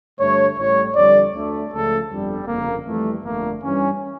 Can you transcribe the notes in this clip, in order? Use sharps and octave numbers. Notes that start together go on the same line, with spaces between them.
G2 D3 A3 C#5
A1 A2 G3 C#5
F2 D3 G3 D5
D2 D3 A3
C#2 C#3 F3 A3 A4
G1 F2 D3 G3
G1 F2 C#3 A#3
F2 E3 G3 A3
G1 F2 D3 A3 A#3
G2 E3 G3 C#4